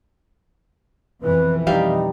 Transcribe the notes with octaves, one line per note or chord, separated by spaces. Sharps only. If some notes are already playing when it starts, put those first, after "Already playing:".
F2 B2 E3 B4
G3 D#4 E5 F5 G5